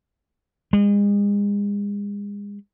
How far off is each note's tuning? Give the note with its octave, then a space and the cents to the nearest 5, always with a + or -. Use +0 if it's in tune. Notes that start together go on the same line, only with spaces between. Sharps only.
G#3 -35